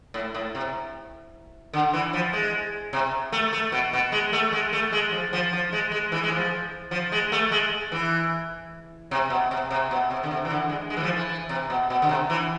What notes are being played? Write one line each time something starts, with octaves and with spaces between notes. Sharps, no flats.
A2
A2
C3
D3
E3
F3
G#3
C3
A3
A3
B2
B2
G#3
A3
G#3
A3
G#3
F3
F3
F3
G#3
G#3
E3
G#3
F3
F3
G#3
A3
G#3
E3
C3
B2
C3
C3
B2
C3
D3
C3
E3
D3
G#3
G#3
E3
F3
E3
E3
C3
B2
B2
D3
C3
E3